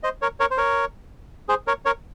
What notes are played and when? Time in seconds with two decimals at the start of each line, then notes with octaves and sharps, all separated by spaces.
0.03 C5 D#5
0.22 A#4 C#5
0.40 A#4 C#5
0.51 C5
0.58 A#4 C#5
1.49 G#4 C5
1.67 A#4 C#5
1.85 A#4 C#5